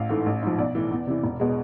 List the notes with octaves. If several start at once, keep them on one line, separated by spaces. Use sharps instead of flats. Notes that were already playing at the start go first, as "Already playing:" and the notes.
Already playing: A1 F5
G#2 E3 A3
A1
G#2 F3
B1 D5
A2 E3
E2
C3 E3
E1
B2 G#3